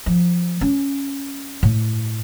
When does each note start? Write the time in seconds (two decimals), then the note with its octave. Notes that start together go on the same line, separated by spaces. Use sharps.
0.06 F3
0.61 C#4
1.63 A2